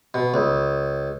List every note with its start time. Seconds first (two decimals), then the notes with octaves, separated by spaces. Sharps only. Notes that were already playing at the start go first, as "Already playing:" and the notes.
0.14 B2
0.34 C#2